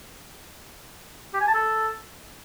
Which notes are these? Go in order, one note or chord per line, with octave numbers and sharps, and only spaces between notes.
G4
G#5
A5
A4